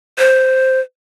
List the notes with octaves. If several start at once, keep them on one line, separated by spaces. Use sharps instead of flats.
C5